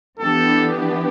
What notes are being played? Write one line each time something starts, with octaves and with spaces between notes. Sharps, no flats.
E3 B3 D4 G4 A4